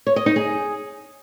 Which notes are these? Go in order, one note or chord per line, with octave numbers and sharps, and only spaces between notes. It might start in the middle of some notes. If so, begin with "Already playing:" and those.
C#5
D#5
D#4
G#4